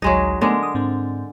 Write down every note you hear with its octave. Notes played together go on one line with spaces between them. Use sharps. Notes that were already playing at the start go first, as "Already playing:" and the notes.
A1 D2 F#3 G#3 D#4
D3 G#3 A3 B3 A#4
D#6
G#2 C4 D4